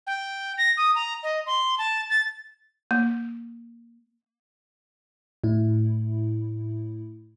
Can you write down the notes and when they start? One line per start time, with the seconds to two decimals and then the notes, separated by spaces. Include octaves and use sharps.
0.07 G5
0.58 A#6
0.77 D#6
0.95 A#5
1.23 D#5
1.46 C6
1.78 A5
2.10 A6
2.91 A#3
5.44 A2 E4